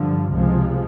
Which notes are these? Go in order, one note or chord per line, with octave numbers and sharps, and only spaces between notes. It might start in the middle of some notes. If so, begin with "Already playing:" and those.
Already playing: G2 D3 F3
C#2 C3 F3 G#3